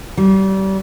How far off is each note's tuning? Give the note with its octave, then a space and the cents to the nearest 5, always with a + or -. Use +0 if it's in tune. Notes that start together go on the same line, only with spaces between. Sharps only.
G3 -30